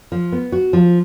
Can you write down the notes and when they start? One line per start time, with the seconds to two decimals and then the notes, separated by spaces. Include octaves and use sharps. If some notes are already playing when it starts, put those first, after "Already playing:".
0.12 F3
0.32 B3
0.52 F#4
0.73 F3